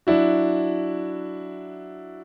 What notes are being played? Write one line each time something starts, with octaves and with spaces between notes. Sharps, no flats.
F#3 D4 E4 F#4